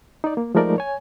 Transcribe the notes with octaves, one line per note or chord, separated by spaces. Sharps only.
D#4 D5
A#3
F3 G#3 A3 D#4 A#4 D5
C#5 G#5